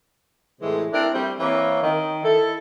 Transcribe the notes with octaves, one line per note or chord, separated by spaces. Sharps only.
A2 C3 E3 G#3
C4 D4 E4 A#4
G3 A3 C4
E3 A#3 C4 C#4
D#3
E4 A4